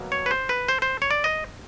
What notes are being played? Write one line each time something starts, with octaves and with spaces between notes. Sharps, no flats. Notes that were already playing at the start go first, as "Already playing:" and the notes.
Already playing: B2 F#3 A#3
C#5
B4
C5
B4
C5
C5
C#5
D5
D#5